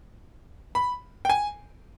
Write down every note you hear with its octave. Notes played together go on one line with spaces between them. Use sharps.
B5
G5
G#5